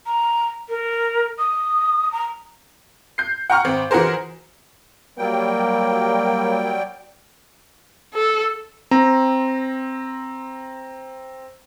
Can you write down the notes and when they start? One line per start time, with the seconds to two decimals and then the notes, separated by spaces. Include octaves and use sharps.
0.06 A#5
0.69 A#4
1.38 D#6
2.12 A#5
3.18 G6 C7
3.50 F#5 G5 A#5 C#6 F6
3.65 G#1 C4
3.91 E3 F#4 G#4 A#4 C5
5.18 F#3 G3 A#3 G5
8.15 A4
8.91 C4 A#5